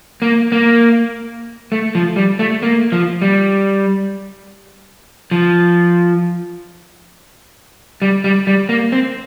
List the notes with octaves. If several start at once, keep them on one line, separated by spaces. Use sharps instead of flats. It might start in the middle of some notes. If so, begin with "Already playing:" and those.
A#3
A#3
A3
F3
G3
A3
A#3
F3
G3
F3
G3
G3
G3
A#3
C4